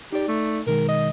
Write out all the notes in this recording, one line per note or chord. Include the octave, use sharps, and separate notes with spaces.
D#4 G4 D5
A3
B2 D#3 G#3 A#4
D#5